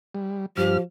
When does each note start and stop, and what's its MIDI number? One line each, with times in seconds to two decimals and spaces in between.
0.15 0.46 55
0.57 0.77 43
0.57 0.82 53
0.57 0.78 67
0.57 0.77 89